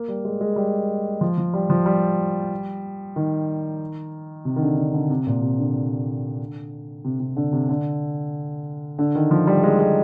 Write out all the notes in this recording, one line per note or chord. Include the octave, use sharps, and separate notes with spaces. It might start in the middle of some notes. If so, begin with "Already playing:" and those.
Already playing: A#3
G3
G#3
G#3
G3
F3
F3
G3
F3
G3
D#3
C3
D#3
D3
D3
D3
C3
A#2
C3
D3
C3
C3
D3
C3
D3
D3
D#3
F3
G3
G#3
G#3